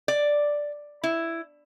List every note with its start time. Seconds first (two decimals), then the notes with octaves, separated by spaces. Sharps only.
0.08 D5
1.04 E4